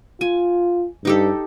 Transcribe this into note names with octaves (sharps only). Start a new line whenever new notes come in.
F4 G#5
G2 D#4 G4 A4